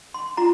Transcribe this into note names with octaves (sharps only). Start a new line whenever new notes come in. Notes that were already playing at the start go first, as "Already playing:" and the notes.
C6
F4 A#5